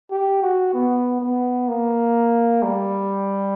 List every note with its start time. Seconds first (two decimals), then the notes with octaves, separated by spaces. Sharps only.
0.11 G4
0.42 F#4
0.74 B3
1.20 B3
1.68 A#3
2.63 G3